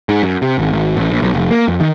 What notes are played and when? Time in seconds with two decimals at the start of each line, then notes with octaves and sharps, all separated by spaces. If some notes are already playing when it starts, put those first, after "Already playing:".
0.09 G#2
0.23 F#2
0.42 C3
0.58 G#1
0.73 G#1
0.97 A1
1.11 A#1
1.22 B1
1.34 F1
1.51 A#3
1.68 F2
1.80 D#3